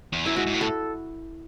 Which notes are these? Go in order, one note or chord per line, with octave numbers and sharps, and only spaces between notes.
E2
F#2 E4
G#2 F#4
G#2
A2
A4